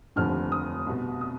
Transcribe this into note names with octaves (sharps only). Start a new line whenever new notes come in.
F1 D#2 D3 F3 F6
D#6
C2 B2
D#6